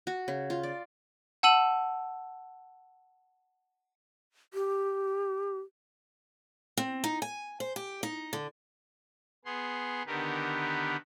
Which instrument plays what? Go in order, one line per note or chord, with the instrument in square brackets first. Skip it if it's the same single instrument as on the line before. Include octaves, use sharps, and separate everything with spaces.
[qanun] F#4
C#3
F4
D5
[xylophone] F#5 A5 E6 D#7 F#7
[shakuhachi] G4
[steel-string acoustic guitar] C4
D#4
G#5
C5
G4
D#4
D3
[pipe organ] B3 G#4 C6
D3 D#3 B3 G4 A#4 B4